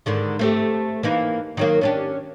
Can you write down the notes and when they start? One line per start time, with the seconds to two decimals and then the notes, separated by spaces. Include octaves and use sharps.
0.06 G#2 D3 D#3
0.39 A3 C4 G4
1.03 E3 A#3 D#4
1.57 D#3 F#3 A#3
1.81 C#4 D4 G4